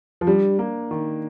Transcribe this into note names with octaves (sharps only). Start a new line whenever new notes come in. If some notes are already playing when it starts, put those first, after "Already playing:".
F3
G3 D4
A#3
D#3